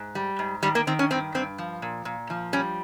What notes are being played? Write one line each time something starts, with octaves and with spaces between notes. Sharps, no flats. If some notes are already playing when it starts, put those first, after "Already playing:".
Already playing: G#2
G3
G#2
D#3 G3
A#3
D#3 C4
C#4
G2 C4
G2 C4
F3
A#2
A#2
F3
G3 C#4